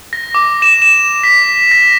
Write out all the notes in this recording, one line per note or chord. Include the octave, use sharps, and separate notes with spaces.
A#6
D6
E7
E7
B6
A#6